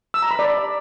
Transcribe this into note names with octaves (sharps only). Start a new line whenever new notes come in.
E6
A#5
B5
D5